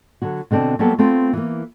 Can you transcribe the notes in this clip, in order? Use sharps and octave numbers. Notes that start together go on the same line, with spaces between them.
D3 F#3 F#4
B2 D3 C4 D4
F#3 G3 A#3 B3 F#4 A4
A3 B3 C4 F4
E3 A#3